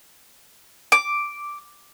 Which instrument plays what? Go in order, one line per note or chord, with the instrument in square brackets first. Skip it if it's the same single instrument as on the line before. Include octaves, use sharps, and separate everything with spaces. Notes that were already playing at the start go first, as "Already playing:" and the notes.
[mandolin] D6